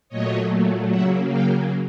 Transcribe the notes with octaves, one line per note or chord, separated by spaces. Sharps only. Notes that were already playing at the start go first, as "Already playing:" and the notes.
A#2 F#3 A3 C#5 D#5
C#3 F#3 A#3 E5 F#5
F5 G5